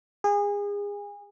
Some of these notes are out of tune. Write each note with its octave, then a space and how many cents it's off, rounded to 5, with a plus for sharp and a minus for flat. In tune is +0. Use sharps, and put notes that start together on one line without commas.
G#4 -30